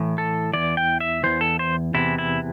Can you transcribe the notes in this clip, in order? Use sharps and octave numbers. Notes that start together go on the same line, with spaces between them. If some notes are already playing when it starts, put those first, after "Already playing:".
Already playing: A2 E3
A4
E2 E3 D5
G5
E5
E2 E3 C5
A4
C5
E2 C3 E3 E4
E4